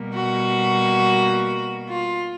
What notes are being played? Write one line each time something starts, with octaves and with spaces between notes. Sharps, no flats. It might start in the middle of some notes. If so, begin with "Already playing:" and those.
Already playing: B2 G3 A#3
F#4
F4